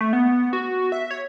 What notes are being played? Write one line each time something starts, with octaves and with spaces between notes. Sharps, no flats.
A3
B3
F#4
E5
C#5